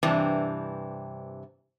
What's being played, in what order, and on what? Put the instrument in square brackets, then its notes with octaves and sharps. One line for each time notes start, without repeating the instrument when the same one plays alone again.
[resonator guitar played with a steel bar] G2 C3 E3 C4 D4